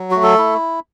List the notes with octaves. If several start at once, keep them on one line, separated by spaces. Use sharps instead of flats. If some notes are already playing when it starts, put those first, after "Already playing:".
Already playing: F#3
A3 F#4
A4
E4